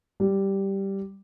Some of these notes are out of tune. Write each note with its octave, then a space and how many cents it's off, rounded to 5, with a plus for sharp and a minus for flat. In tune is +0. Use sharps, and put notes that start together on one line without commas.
G3 -5